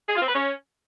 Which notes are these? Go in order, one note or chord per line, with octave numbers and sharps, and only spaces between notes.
G#4
F4
C4
B4
C#4